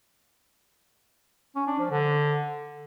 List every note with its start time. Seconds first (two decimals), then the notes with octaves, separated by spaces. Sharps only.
1.56 C#4
1.67 D4
1.79 F3
1.91 D3